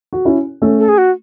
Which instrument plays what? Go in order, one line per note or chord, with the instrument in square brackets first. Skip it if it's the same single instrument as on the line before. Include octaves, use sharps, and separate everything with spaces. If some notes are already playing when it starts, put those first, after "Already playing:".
[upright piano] F#4
C#4 E4
A3 C#4
[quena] A4
G#4
F#4